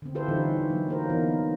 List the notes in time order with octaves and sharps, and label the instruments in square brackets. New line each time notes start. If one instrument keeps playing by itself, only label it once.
[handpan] D3 C4
E4 F4 G4 A4 B4 C5
D3 E3 G3 C#4 D#4
F#3 A#3
A#3 A#4 C5
E3 F#3 B3 D#4